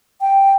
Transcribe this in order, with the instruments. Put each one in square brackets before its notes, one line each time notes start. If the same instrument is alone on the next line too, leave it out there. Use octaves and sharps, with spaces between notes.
[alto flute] G5